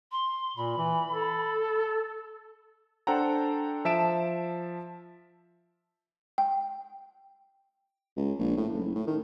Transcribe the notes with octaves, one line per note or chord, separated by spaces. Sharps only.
C6
A#2 B5
E3
A4
D4 A4 C5 F#5 G5 A#5
F3 E5 A5 D7 E7
G5
C#2
A#1
A2
F#1
A2
D#3